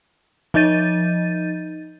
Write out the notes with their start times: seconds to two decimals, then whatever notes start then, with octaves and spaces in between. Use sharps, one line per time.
0.54 F3 D#4 D#5 G6 A6 D#7